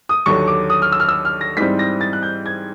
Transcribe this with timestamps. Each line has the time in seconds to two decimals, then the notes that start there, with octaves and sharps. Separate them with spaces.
0.09 D#6
0.26 D#2 D3 F#3 C#6
0.48 D6
0.70 D#6
0.82 F6
0.92 E6
1.00 F6
1.08 E6
1.25 F6
1.41 A#6
1.57 G#2 E3 G3 C4 B6
1.79 A#6
2.01 A6
2.13 F#6
2.23 G6
2.46 G#6